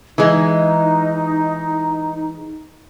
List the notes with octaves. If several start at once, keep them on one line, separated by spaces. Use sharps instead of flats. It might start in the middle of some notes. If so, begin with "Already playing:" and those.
E3 G#3 D#4